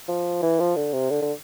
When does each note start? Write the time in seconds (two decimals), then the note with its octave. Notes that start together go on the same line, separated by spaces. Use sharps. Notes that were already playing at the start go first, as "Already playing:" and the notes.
0.08 F3
0.42 E3
0.60 F3
0.76 D3
0.93 C3
1.10 D3
1.22 D3